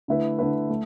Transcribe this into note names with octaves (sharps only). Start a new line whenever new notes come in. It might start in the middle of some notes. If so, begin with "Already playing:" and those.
D3 A3 E4 B4
D3 A3 E4 B4
A3